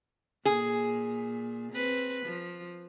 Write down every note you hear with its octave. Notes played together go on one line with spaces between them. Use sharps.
A#2 G#4
C4 B4
F3